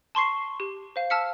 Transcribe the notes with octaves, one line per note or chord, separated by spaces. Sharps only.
A5 C6 C#6 C7
G4
C5 F5
A5 E6 F6 B6 C#7